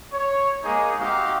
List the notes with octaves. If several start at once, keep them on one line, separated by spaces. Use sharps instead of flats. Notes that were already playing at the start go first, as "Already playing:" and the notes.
C#5
G#3 A#3 D#4 G#4
C4 D#4 F#4 G4 F5